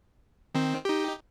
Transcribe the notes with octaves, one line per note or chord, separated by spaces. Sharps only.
D#3 C4
D#4 G4